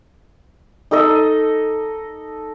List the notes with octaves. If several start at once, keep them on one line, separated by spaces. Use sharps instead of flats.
D#4 A4 D#5